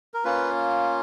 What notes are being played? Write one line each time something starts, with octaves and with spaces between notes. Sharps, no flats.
A#4
A#3 C#4 F4 B4